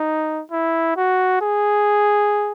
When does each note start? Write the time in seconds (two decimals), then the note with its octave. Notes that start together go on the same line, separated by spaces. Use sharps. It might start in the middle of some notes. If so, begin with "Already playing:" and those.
Already playing: D#4
0.52 E4
0.97 F#4
1.42 G#4